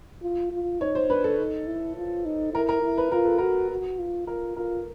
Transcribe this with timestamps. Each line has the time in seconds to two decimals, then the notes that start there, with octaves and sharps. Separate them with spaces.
0.23 F4
0.52 F4
0.81 D#4 C#5
0.95 C5
1.09 D4 B4
1.24 A4
1.39 D#4
1.67 E4
1.97 F4
2.25 D#4
2.54 E4 A#4
2.69 A#4
2.83 E4
2.98 B4
3.12 F4 A#4
3.25 A4
3.38 F#4 A#4
3.70 F#4
3.99 F4
4.27 F4 A#4
4.56 F4 A#4